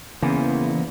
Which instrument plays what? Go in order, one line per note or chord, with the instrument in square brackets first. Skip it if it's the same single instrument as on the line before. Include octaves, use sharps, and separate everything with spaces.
[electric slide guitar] E2 [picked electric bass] C#3 [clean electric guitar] E3 [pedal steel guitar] A#3 B3 C5